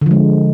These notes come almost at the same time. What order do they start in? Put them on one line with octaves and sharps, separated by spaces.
D3 F3 G#3